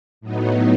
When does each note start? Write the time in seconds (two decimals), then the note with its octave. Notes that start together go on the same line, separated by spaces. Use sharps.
0.21 A2 F#3 B3 D#4